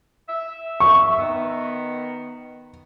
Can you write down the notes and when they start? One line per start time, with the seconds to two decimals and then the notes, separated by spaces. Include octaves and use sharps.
0.29 E5
0.80 C#6
1.19 D#3 B3